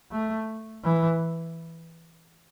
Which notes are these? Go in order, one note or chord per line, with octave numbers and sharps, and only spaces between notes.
A3
E3